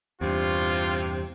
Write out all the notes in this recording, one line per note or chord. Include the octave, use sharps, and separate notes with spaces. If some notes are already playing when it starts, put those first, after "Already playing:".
E2 G2 C3 F4